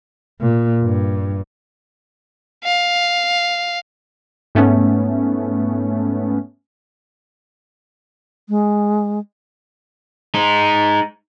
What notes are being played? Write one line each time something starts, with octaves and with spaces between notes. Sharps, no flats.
A#2
G2
F5
G#2 A3 B3 C#4
G#3
G#3 D#4